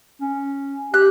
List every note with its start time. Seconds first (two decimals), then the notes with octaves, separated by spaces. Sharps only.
0.21 C#4
0.94 G4 F#6